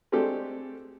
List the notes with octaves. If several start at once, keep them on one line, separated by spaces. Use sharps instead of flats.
G#3 A3 C4 D4 G4 A4